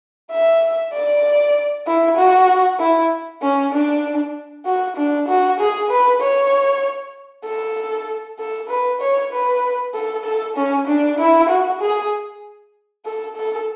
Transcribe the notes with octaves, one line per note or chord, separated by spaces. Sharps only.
E5
D5
E4
F#4
E4
C#4
D4
F#4
D4
F#4
G#4
B4
C#5
A4
A4
B4
C#5
B4
A4
A4
C#4
D4
E4
F#4
G#4
A4
A4